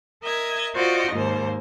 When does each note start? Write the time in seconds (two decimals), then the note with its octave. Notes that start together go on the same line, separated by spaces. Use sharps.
0.23 A#4 D#5 E5 G#6
0.75 F4 F#4 C5 D5 D#5
1.12 D#2 G#2 A#3 C5